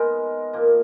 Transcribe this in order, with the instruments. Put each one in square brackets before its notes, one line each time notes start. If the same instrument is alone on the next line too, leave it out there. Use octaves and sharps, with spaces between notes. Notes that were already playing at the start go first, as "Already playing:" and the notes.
Already playing: [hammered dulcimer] G#3 B3 D#4 A#4
A#2 F3 A#3